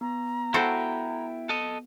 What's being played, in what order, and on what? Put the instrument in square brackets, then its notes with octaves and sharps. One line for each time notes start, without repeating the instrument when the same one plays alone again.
[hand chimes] B3 [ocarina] A#5
[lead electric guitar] E4 G5 [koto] F#4 A4 C5
[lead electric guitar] A4 D#5